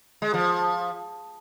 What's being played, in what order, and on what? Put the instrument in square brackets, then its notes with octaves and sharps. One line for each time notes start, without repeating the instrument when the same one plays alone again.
[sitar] G#3
F3